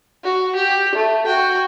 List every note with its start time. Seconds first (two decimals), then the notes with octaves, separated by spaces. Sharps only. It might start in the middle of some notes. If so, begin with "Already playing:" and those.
0.24 F#4
0.55 G4
0.95 A3
1.26 F#4 G5